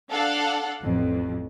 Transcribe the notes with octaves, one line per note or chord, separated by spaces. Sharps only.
D4 A4 F5 F#5
A1 F2